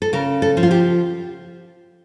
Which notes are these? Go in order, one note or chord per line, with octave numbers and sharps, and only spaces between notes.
A4
C#3 A#4
A4
F3
F4
G4